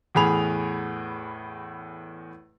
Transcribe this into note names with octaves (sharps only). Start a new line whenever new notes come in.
E2 A2 G#4 B5 F7